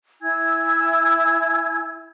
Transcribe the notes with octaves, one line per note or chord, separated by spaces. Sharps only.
E4 G#5 E6 G#6